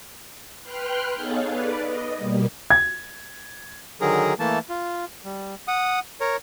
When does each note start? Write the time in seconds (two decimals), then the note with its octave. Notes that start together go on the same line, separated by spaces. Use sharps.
0.61 B4 G5 C6 F6 F#6
1.15 B3 D#4 G#4 A4 C#5 F5
1.47 B4 D5
1.83 D#5
2.15 B2 G3 A#3
2.70 G#6
4.01 D3 D#3 F#3 G#4 A#4
4.39 E3 A3 A#3 A5
4.70 F4
5.25 G3
5.68 F#5 D#6
6.21 A#4 C#5